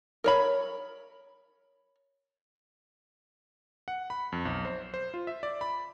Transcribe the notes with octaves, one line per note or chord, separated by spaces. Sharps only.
A#4 C#5 B5
F#5
B5
F2
B1
C5
C5
F4
E5
D5
B5